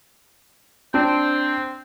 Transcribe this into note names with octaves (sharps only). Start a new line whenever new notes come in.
C4 D4